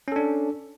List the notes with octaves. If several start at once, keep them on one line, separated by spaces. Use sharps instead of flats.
C#4 D4 A4